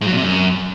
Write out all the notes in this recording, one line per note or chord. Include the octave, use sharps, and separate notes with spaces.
G#2
F#3
A#2
C3
F#2